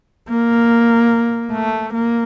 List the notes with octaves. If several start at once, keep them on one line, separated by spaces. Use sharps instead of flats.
A#3
A3
A#3